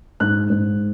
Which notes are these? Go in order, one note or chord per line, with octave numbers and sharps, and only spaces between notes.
G#2 F#6
G#2